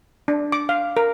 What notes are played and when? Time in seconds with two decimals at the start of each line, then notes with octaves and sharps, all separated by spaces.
0.28 D4
0.52 D6
0.69 F5
0.97 A#4